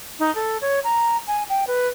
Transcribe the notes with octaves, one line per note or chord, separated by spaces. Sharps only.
D#4
A4
C#5
A#5
G#5
G5
B4